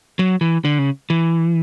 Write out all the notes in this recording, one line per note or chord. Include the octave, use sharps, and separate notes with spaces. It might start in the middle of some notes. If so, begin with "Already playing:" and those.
F#3
E3
D3
C#3
E3